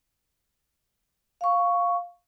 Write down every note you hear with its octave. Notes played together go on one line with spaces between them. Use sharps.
F5 C#6